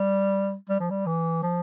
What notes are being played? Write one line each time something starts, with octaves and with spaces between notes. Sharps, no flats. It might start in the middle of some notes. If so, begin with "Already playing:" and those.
Already playing: G3
G3
F3
G3
E3
F3